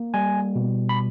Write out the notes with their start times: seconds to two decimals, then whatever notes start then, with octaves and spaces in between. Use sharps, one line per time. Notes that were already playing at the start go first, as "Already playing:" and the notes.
Already playing: A#3
0.14 G3 G#5
0.56 B2
0.89 B5